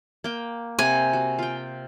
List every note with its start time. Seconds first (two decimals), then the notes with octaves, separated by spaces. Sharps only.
0.24 A#3 G5
0.79 C3 F#5 G#5 A#5
1.13 F#4
1.39 F4 G5